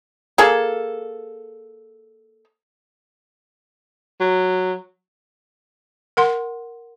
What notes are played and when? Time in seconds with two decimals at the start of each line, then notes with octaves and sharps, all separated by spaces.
0.38 A#3 G#4 A4
4.21 F#3
6.17 A#4 F#5 C6